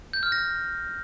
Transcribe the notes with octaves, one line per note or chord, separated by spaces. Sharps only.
G6
F6
A#6